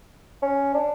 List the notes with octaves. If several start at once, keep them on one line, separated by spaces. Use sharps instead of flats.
C#4
D4